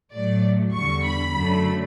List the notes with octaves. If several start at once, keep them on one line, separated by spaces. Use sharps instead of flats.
A2 F#3 A3 D5
E2 D3 G3 C#6
B5
F#2 D3 F#3 A3